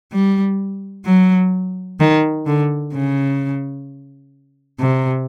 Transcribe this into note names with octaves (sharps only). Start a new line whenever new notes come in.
G3
F#3
D#3
D3
C#3
C3